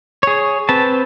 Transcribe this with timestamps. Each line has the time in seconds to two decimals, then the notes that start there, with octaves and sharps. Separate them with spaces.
0.23 G#4 C#5
0.69 C4 B4 A5